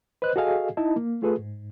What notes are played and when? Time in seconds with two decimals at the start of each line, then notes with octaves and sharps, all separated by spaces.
0.22 B4 C5 D#5 F#6
0.36 F#4 G#4 A4 D#5 F5 G#5
0.77 D#4 E4 D#5 A5
0.96 A#3
1.22 A3 F4 G#4 A4 B4
1.39 G#2